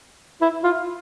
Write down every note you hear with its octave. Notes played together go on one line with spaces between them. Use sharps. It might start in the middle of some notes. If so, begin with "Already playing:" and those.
E4
F4